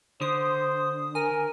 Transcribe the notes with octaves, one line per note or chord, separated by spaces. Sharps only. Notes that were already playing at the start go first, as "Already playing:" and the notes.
D3 C5 D#6
A#4 G#5